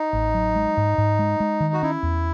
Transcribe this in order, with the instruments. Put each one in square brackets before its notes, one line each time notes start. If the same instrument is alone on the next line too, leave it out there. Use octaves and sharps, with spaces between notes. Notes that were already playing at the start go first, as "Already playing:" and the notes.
Already playing: [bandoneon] D#4
[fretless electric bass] A1
F#3
G#3
G#2
G#2
G#3
G#3
D#3
[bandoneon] F#4
[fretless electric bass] C#4 [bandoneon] E4
[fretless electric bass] E2